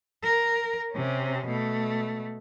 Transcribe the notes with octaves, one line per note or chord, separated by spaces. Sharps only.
A#4
C3 C#4
B2 A3